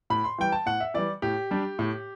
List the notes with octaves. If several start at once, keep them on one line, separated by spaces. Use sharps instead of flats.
A2 B5
C6
E3 G3 G5
A5
A2 F#5
E5
E3 G3 D5
A2 G4
G3 D4
A2